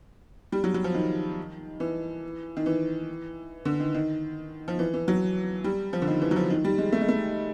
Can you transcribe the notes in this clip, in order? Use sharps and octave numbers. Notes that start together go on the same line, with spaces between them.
G3
F#3
F#3
F3
D#3
E3
D#3
E3
D3
D#3
D#3
F3
E3
E3
F#3
G3
F3
D3
D#3
E3
F#3
F3
D#3
G3
G#3
A3
G#3
A3